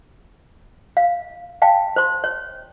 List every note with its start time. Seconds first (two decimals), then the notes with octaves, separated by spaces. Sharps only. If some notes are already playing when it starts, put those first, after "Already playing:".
0.97 F5
1.62 F5 G5 A5
1.96 C5 C6
2.24 C#5